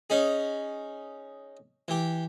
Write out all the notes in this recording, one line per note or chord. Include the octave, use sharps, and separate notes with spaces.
C#4 D#4 G#4
E3 G4